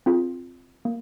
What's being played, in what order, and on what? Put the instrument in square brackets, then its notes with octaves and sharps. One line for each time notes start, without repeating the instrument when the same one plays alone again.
[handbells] C4 F4 G#4
A#3